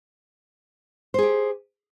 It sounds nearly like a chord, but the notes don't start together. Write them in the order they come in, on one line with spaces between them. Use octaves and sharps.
C5 G#4 G4